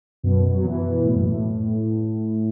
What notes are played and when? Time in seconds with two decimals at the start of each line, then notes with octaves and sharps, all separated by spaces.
0.23 F#2 B2
0.55 F#3
0.65 B2 E3
1.05 A2
1.16 F#2
1.26 A2